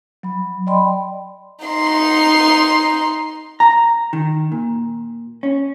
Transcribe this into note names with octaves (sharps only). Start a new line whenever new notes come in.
F#3 B5
D5 D#5 G5 B5 C6
D#4 C6
A#5
D#3
A#2
C#4